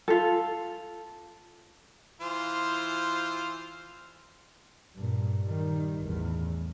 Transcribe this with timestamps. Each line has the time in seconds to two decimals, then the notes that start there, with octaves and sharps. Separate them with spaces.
0.08 F4 A4
2.21 E3 F4 C5
4.95 G2 A#2
5.44 D#3 G3
6.03 A1 E2